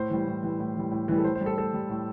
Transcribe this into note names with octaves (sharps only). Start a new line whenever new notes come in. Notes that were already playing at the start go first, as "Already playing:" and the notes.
Already playing: A2 C5
E3 G3
A2
E3 G3
A2
E3 G3
A2
E3 G3
A4
A2 C5
C5
G3
A4
A2 A4
G3
A2